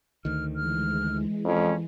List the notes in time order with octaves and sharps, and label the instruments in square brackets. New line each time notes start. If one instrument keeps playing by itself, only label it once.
[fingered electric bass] D2 D#3 [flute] F6
[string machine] E3 G#3 [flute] F6
[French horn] F2 [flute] C#4